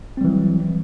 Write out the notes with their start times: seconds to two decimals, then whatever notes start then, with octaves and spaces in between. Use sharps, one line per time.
0.17 C4
0.21 G3
0.24 E3
0.28 F#3